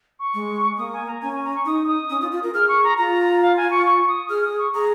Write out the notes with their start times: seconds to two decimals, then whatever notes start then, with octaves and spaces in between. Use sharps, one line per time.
0.19 C#6
0.34 G#3
0.78 A#3 D#6
0.93 G#5
1.07 A#5
1.21 C#4 G#5
1.33 G#5
1.44 A#5
1.55 C#6
1.66 D#4 D#6
1.88 D#6
2.10 C#4
2.21 F4
2.32 F4
2.43 A#4
2.54 G#4 F6
2.68 C#6
2.84 A#5
2.98 F4 A#5
3.42 F5
3.57 G#5
3.71 C#6
3.86 C#6
4.08 D#6
4.29 G#4 F6
4.45 D#6
4.59 C#6
4.74 G#4 A#5